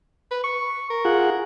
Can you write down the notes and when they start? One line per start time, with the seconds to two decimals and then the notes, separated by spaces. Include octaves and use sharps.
0.31 B4
0.44 C#6
0.90 A#4
1.05 F4 G#4 F#5